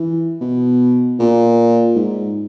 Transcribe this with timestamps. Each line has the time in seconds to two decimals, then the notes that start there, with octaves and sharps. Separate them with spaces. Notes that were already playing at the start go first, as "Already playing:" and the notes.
Already playing: E3
0.41 B2
1.19 A#2
1.96 G#2